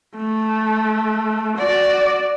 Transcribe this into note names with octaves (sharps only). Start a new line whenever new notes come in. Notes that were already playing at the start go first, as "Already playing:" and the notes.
A3
F#4 D5